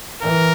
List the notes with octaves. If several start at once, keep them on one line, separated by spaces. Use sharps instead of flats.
E3 A#4